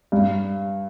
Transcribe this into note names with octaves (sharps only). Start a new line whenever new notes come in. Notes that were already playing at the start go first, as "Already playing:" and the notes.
G2